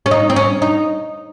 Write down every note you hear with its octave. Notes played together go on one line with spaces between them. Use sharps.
C#4
D#4
C4
C#4
D#4